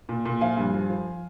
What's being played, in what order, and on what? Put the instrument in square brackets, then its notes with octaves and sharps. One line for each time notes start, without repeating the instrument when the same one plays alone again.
[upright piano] A#2
A#2
F3 F5 G#5
G2
F3
F3